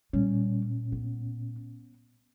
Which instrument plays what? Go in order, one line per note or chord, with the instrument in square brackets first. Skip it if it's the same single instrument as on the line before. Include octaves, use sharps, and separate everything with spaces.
[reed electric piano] A#2 C#4 [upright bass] G3
[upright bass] B3